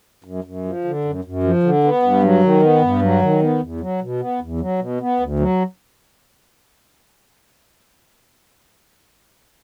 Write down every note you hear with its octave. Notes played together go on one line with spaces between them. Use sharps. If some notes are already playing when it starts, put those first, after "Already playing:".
F#2
F#2
F3
D3
F#2
F#2
F3
D3
B3
G2
F#3
D#3
B3
G2
F#3
D#3
B3
E2
F#3
B2
B3
E2
F#3
B2
B3
D2
F#3